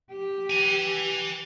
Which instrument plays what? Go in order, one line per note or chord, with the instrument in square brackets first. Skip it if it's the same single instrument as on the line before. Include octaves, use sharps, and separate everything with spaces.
[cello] G4
[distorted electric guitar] B4 G#5